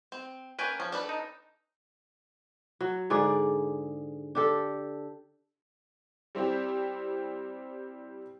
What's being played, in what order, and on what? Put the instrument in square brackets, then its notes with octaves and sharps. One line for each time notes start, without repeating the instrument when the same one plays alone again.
[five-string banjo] C4
[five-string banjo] A#3 C#4 A#4 [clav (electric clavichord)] B4 G5 G#5
[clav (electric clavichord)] F3 [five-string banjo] C#4
[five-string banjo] D4 A4 B4
[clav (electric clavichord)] D#4
[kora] F#3
G#2 D3 G#4 D5
D4 G4 A4
[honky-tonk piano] G3 C4 E4 G4